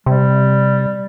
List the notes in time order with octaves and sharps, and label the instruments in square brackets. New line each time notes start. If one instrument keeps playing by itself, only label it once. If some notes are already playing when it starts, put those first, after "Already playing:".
[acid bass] C3 [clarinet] G3